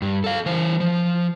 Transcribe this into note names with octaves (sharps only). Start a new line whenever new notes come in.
G2
A4 F5
E3 C5
F3